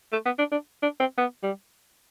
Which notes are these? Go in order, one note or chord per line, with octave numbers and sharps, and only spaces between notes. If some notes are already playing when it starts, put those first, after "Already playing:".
A3
B3
D4
D4
D4
C4
B3
G3